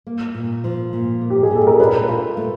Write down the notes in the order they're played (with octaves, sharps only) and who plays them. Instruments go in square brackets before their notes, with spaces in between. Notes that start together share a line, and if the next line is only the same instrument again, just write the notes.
[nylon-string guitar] A#3
A#2
F3
A#2
A#3
[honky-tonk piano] G4
G#4
[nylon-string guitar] A#2 [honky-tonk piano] A4
[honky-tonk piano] A#4
[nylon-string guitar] D4 [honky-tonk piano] B4
[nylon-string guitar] F4
A3